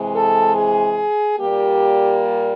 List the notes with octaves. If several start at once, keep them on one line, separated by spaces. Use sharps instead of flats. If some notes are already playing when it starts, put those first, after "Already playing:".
Already playing: C3 E3 G#3
A4
G#4
A#2 G3 A#3 G4